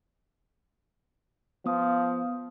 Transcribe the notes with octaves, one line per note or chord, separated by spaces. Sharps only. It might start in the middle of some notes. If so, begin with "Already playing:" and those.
F3 B3 D#6